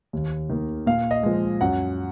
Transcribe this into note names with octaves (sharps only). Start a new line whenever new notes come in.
D#2
D#3 A#3
A#2 F5
D#5
F3 G#3
F#2 F#5